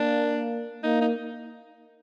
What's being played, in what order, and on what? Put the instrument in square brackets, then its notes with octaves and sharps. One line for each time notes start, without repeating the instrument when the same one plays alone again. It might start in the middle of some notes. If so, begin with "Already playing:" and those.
Already playing: [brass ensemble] A#3 [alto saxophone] D4
[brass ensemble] A#3 [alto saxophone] D#4
[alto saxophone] D#4